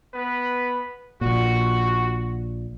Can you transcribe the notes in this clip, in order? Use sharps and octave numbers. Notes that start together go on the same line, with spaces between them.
B3 B4
A#1 A#2 F#4